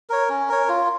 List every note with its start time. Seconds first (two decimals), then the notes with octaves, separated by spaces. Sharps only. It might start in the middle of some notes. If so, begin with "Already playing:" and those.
0.10 A#4 C#5
0.29 C#4
0.49 A#4 C#5
0.69 F4